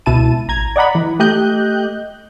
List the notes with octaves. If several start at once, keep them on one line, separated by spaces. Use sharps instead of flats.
C#2 B2 E4 A5 D#7
A1 A#5 G#6
D5 D#5 F#5 A#5 B5
E3
A3 G4 D#5 F#6 G6